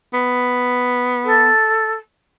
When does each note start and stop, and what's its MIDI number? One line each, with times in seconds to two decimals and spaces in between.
0.14 1.49 59
1.24 1.94 69